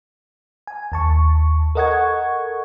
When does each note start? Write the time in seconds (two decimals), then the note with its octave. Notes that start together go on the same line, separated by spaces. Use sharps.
0.67 G#5
0.92 D#2 A5 C#6
1.75 A4 A#4 D#5 F#5 C#6 G#6